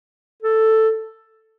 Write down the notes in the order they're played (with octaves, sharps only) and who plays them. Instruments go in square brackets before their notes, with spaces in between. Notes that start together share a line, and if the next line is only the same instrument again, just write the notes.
[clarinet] A4